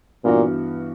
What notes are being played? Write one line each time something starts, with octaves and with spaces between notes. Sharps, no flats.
G2 A#2 E3 B3 F#4